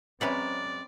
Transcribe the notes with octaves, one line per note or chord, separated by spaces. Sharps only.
F#2 G#3 C4 C#4 B4 D5 F#5 A#5